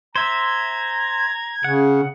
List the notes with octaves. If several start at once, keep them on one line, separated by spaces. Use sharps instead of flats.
C5 E5 A#5 G#6
C#3 F#5